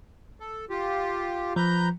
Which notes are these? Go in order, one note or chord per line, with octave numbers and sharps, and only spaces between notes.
A4
F4 G4
F3 B4 A#5 G6